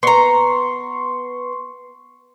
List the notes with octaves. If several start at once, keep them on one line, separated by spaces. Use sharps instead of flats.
B3 A#5 C6 C#6